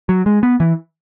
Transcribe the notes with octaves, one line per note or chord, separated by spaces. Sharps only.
F#3
G#3
B3
E3